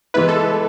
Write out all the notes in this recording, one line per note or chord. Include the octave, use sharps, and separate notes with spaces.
E3 G#3 B3 E4 B4
A4